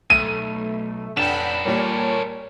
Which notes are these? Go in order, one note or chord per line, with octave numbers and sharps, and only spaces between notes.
B1 A3 D#7
F1 C#4 D4 A4 F#5 G5 B5 E7
A#2 G3 A#4 C#5